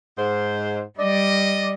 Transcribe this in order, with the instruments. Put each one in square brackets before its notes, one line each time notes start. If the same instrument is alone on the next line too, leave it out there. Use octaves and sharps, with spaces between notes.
[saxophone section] G#2 C5
[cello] G3 [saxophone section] D5 [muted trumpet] D#5